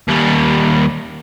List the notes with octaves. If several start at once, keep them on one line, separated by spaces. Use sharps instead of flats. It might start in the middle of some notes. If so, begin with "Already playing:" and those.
D#2 G3